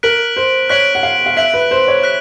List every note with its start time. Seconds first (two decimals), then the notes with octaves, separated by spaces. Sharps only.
0.03 A#4 F#6 B6 D7 F#7
0.37 C5
0.69 C#5 F#6 B6 D7 F#7
0.95 F#5
1.03 F5
1.26 F5
1.37 E5 F#6 B6 D7 F#7
1.54 B4
1.71 C5
1.88 C#5
2.03 F#6 B6